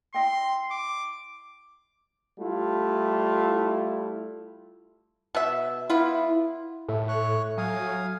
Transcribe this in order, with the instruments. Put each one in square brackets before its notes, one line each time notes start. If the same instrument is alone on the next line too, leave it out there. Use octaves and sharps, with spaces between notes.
[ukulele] E4 D#5 G5 [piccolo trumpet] C6
[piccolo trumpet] D6
[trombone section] G3 A3 E4 F4
[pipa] B2 E5
[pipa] B3 F4 [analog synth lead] E4
[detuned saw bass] A2 [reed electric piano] A4 E5
[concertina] C#5 C#6 F#6
[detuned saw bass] F#3 [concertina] F5 G#5 D#6